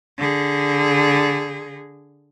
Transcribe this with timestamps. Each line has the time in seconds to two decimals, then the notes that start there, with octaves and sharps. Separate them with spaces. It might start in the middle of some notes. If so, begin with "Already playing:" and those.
0.18 D3 G#4